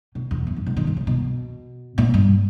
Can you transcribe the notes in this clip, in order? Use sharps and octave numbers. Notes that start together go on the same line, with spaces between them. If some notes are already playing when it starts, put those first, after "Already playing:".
B2
E2
G2
G#2
B2
D#3
D#3
C#3
B2
A#2
G2